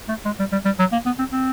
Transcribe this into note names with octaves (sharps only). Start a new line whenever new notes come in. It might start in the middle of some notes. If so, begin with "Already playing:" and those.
A3
G#3
G3
G3
G3
F#3
A#3
B3
C4
C4